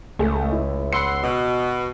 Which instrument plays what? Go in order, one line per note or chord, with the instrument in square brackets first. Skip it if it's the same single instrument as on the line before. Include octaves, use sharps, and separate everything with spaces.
[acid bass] C#2 [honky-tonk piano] A3 G#4
[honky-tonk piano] E4
[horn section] F#5 C6 [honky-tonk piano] B5 E6 C#7
[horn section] B2